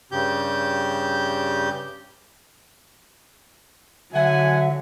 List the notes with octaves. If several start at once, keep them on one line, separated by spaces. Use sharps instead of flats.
G2 C#3 G4 G6
D3 F#3 E5 F#5 G#5